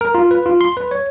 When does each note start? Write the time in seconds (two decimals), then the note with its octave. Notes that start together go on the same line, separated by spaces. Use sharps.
0.01 A#4
0.15 F4
0.31 B4
0.46 F4
0.61 C6
0.77 B4
0.91 C#5